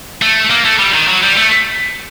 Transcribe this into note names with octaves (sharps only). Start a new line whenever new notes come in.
A3
A#3
A3
G3
D#3
F#3
G3
A3